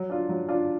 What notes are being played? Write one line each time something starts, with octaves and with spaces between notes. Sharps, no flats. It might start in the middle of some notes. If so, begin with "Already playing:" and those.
Already playing: F#3
D4 F4
F#3
D4 F4